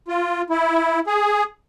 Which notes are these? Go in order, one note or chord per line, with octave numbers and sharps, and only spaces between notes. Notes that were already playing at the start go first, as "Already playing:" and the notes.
F4
E4
G#4